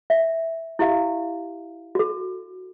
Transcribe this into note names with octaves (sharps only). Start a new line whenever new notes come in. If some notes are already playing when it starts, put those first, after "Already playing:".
E5
E4 G4 E5 F5
F#4 A4